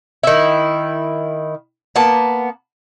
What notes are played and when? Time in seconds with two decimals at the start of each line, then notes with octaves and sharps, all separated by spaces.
0.23 D#3 E4
1.96 A#3 B3 A5